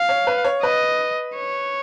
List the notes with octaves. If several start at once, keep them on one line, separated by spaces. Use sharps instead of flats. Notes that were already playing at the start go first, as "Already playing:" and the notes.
Already playing: F5
C#5
B4
C#5
B4 D#5
C#5